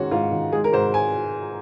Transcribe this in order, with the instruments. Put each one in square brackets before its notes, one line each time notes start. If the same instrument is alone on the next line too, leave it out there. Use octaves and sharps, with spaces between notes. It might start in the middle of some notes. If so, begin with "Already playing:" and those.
Already playing: [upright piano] G#2 D#3 G#3 C#4 F#4
G#2 F4
D#3
G#3 G#4
A#4
G#2 C5
G#5